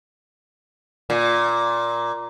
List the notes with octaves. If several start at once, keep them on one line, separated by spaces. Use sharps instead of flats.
A#2